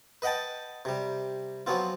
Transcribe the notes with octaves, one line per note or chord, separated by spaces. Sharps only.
B4 D#5 F#5 G5 A5
C3 G3
F3 F#3 B3 C4 F4